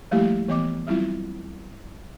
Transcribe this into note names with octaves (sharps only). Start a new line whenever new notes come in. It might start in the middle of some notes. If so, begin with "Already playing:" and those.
F3 G3 A3 A#3 E4 G4
E3 B3 D#5 D6
F#3 G3 C4 E4 F4